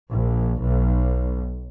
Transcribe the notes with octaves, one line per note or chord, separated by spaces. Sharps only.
A#1
B1